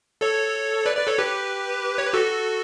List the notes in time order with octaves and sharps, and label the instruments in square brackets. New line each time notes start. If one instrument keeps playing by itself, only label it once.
[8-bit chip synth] A4 C#5
B4 D5
B4 D5
A4 C#5
G4 B4
C#5
B4
F#4 A4